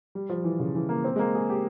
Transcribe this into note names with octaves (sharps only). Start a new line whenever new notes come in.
G3
F3
E3
C#3
E3
A#3
C4
G#3
A#3
G#4
G4